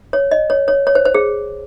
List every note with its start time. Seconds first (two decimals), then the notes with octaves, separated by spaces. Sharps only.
0.13 C#5
0.31 D#5
0.50 C#5
0.68 C#5
0.87 C#5
0.95 C5
1.05 C5
1.15 G#4